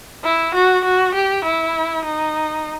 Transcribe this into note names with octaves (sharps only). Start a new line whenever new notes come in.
E4
F#4
F#4
G4
E4
D#4